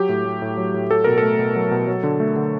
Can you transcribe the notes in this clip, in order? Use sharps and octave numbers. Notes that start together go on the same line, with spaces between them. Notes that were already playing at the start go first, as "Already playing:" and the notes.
Already playing: F#3 G4
A2
A3
A2
F#3
A2
F#3 A4
B2 A#4
A3 A4
B2
F#3
B2
F#3
D3
A3
D3